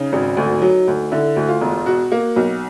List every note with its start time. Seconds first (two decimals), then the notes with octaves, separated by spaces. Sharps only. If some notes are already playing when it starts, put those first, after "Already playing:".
Already playing: C#3 D#4
0.13 G#1
0.37 D2
0.62 F#3
0.87 D2
1.12 D3 E4
1.36 D2
1.49 F4
1.61 E1
1.86 B2 F#4
2.12 A#3
2.36 B1